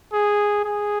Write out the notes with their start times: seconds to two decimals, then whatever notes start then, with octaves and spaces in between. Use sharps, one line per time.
0.13 G#4
0.65 G#4